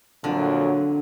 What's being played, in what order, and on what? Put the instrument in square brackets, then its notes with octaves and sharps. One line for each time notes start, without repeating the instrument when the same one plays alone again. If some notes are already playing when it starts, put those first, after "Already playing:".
[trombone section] F2 A#2 F#3 [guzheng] D3